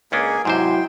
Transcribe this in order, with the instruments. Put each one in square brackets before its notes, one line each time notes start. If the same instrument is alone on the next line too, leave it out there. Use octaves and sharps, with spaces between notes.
[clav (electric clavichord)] C#2 C#4 D4 [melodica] A#3 G#4 G#5
[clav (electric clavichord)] G#2 C3 C5 [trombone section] F#3 E4 F#4 [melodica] G5 C6